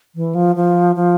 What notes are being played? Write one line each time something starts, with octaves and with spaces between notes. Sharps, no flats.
E3
F3
F3
F3